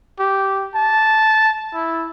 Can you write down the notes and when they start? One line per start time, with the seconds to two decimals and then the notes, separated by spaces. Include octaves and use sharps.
0.19 G4
0.75 A5
1.74 E4